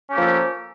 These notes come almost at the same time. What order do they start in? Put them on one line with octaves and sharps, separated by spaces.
C#4 G4 A#3 F3 A4